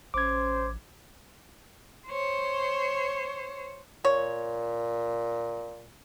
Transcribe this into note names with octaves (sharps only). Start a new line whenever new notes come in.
A1 C#4 C5 D6 G#6
C5 C#5
A#2 C#5